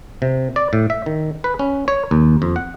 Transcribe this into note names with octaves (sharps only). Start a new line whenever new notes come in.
C3
D5
A2
E5
D#3
B4
C#4
C#5
D#2
F2
F#5